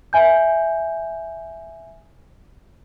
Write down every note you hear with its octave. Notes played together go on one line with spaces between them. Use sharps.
E5 G#5 G6